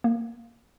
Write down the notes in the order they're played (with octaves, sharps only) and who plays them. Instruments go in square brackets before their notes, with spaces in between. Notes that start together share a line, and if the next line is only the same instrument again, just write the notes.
[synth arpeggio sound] A#3